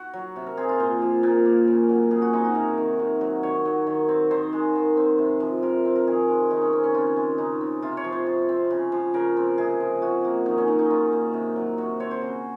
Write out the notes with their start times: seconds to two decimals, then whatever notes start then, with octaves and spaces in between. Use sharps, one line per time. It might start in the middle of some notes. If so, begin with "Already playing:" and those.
Already playing: F#4
0.14 F#3
0.36 C3
0.46 A#4
0.57 C4 G#4
0.69 F4
0.80 A#2 C5
1.02 F3
1.23 A#2 A#4
1.45 A#3
1.68 C#3
1.89 F#3
2.11 C#3 G#4
2.22 F#4
2.33 C4 D#4
2.44 F#4
2.55 C3 A#4
2.78 D#3
2.99 C3
3.21 F#3
3.43 D#3 C#5
3.65 F#3
3.87 D#3
4.08 C4
4.31 D#3 C5
4.53 G#3
4.75 D#3
4.97 C4
5.19 C3
5.40 F3
5.62 C3 A#4
5.85 C4
5.96 A#4
6.07 D#3 G#4
6.29 G#3
6.50 D#3 D#4
6.62 C#4
6.73 C4
6.84 C#4
6.94 C#3 F4
7.17 G#3
7.38 C#3 D#4
7.61 C4
7.82 C3 F4
7.97 C#5
8.04 F3
8.12 C5
8.26 C3
8.49 C4
8.71 C#3
8.92 F3
9.14 C#3 A#4
9.37 C4
9.58 C3 G#4
9.80 F3
10.02 C3 F#4
10.25 A#3
10.46 D#3 D#4
10.58 C#4
10.68 F#3 D#4
10.79 D#4
10.90 D#3 F4
11.12 A#3
11.34 C3
11.56 F#3
11.78 C3 F#4
12.00 C4 C#5
12.11 C5
12.22 C#3